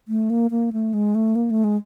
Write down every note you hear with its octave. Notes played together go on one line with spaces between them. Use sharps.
A3
A#3
A#3
A3
G#3
A3
A#3
A3
G#3